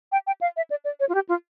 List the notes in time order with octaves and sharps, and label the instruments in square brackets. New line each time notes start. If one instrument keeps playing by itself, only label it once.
[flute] G5
G5
F5
E5
D5
D5
C#5
F4
G4
F4